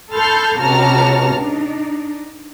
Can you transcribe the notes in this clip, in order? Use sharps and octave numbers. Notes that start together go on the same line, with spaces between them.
A4 A5 B5 C6 F6 G6
C#2 C3 F#4 A5 A#5 F6
D4 D#4